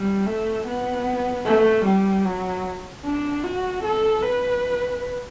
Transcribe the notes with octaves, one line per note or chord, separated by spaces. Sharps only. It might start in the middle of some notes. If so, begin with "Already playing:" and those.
Already playing: G3
A3
B3
A3
G3
F#3
D4
F#4
A4
B4